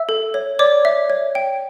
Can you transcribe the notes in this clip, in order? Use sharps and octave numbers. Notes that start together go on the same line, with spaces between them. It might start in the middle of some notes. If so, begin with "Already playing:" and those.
Already playing: E5 E6
A4
C#5
C#5 D5 D6
E5
C#5
G5